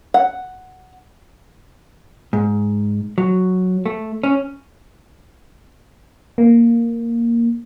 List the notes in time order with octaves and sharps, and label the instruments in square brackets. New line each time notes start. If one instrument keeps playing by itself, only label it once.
[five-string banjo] F#5
[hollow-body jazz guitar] G#2
F#3
A3
C#4
[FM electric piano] A#3